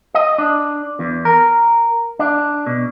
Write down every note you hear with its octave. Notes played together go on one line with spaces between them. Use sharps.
D#5
D4
E2
A#4
D4
B2